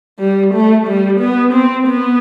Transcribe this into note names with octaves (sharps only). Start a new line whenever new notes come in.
G3
A3
G3
B3
C4
B3